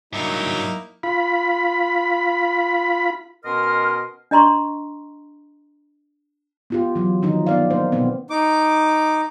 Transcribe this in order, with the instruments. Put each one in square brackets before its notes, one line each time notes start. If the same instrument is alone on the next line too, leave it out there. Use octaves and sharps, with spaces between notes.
[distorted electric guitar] G2 F#3 [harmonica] A#3 D#4 E4
[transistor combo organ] F4 B5
[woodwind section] B2 C#4 A#4 D#5 C6 F6
[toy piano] D4 D#5 A#5 C6 C#6
[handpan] B3 F4 G4
E3 F#3
D#3 F3 D#4
B3 D5 F5
A#3 D#4 C5
B2 B3 C4
[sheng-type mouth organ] D#4 D6